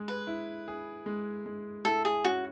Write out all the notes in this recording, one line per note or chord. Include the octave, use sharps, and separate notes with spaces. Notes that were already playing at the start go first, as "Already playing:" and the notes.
Already playing: G#3 G#4
B4
E4
G#4
G#3
G#3
E4 A4
G#4
C#4 F#4